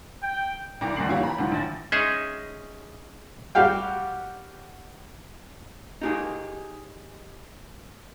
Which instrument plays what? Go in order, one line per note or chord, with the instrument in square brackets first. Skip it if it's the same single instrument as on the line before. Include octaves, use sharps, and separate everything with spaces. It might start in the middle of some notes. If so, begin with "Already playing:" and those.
[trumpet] G5
[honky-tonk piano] C2 E3 D5 G5 A#6 D7
F#1 D2 G2 C7 F#7
E3 A#3 E4 G4 C#5
G5 A#5 B5
C#2 D3 E3 F#3
A1 A6
[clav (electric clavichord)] G#3 C#4 D#4 G#4 D#5 E5
[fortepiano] G3 F#4 G4 F5 G5
[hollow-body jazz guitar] D#4 G4 G#4